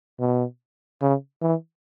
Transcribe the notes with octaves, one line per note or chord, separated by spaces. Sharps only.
B2
C#3
E3